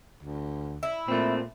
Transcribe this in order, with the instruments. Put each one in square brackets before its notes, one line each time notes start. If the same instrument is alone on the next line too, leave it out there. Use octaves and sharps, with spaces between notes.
[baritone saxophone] D2
[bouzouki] E4
[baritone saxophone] A#2 [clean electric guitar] A3 C4